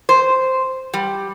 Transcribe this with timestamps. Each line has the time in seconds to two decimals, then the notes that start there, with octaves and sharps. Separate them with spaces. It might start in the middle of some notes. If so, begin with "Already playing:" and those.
0.09 C5
0.94 G3